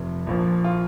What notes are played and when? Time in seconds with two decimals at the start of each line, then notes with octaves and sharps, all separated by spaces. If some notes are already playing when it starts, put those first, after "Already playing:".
Already playing: F1 F2 C3
0.27 A#1 A#2 F3
0.64 F4